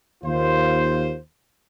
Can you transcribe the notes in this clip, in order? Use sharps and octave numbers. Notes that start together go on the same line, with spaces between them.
D#2 F4 C5